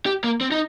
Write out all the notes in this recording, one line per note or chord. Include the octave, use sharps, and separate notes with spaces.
G4
A#3
C4
D#4